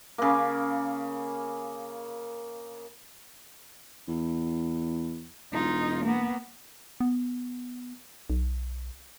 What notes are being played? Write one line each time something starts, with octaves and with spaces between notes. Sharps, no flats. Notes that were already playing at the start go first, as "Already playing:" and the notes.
C#3 A#3
E2
E1 D#4 F4
A#3 B3
B3
B1